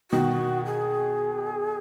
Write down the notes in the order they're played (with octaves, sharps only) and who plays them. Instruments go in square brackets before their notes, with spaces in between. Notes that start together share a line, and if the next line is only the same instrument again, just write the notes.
[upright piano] B2 D#3 [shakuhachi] F#4
[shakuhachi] G#4